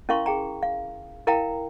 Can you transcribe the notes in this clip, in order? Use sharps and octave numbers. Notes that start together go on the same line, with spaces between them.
C#4 E4 A#4 F5 C6 C#6
G#4 G5 A#5
F5
E4 A#4 F5 G5 A#5